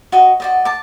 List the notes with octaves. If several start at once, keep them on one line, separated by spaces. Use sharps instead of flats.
F#4 D#5
F#4 D5 D#5
A5 D6